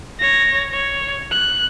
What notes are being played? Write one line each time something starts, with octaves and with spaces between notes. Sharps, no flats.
C#5 A#6
C#5
F#6